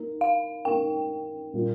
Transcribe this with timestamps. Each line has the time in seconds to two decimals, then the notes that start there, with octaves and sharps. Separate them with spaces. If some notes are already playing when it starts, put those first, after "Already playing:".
Already playing: A#3 D#4 A#4
0.21 F5
0.65 A#3 D#4 A#4 G5
1.53 A#2 G3 A#3 F4